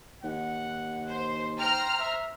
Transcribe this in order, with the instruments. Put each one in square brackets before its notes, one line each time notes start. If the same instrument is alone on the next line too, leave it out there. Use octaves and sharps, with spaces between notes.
[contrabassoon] D#2 [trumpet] F#5
[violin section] C5
[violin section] C5 A#5 F6 [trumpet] G5
[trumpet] E5